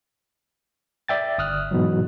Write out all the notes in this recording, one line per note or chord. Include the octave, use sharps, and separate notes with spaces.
D5 E5 G5 A6
G1 D#6 F6 F#6
G#2 B2 E3 F#3